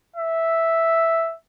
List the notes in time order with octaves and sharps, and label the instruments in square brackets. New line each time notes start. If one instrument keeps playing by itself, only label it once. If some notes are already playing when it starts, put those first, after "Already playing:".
[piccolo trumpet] E5